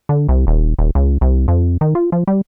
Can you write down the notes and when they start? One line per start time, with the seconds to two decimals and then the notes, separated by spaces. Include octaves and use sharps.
0.09 D3
0.29 C2
0.47 D#1
0.79 D#1
0.95 C#2
1.21 C2
1.48 F2
1.81 D#3
1.95 F4
2.12 F3
2.27 G3